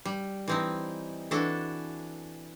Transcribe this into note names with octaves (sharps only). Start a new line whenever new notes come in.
G3
E3 C4 D#4
E3 D4 F#4 A4